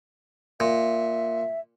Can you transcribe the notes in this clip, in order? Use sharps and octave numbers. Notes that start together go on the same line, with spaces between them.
A#2 E5